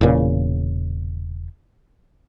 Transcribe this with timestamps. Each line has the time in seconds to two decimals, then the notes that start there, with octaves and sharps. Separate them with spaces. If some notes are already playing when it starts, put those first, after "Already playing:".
0.01 E1 E2 A#2 C#3